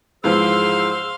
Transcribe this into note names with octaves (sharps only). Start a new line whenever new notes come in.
G#2 E3 F3 G#4 C5 F5 C6 E6